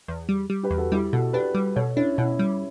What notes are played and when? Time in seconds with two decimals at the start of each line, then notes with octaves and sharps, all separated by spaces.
0.08 E2
0.29 G3
0.50 G3
0.63 G4 B4
0.71 E2
0.77 F#4 A4
0.92 G3 E4 G4
1.13 B2 F#4 A4
1.33 D4 G4 B4
1.55 G3
1.76 B2 A4 C#5
1.96 C#4 D4 E4
2.18 B2 C#4 E4
2.39 G3